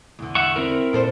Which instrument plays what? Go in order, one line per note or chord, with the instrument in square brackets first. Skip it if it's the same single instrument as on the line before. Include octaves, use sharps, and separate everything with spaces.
[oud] E2 D3
[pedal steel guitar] E5 F#5 C#6
C4 E4 A#4
[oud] A#2 A4 C5